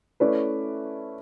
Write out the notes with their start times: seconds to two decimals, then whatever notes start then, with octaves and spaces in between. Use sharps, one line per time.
0.20 A3 C#4 E4 B4 D5